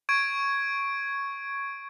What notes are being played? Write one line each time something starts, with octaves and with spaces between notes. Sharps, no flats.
C#6 G#6 D7